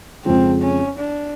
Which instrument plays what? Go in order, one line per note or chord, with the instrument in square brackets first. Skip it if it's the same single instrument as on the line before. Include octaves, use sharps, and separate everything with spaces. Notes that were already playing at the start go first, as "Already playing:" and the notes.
[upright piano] F2 C#3 F3 G#3 [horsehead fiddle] C4
[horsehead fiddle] C#4
D4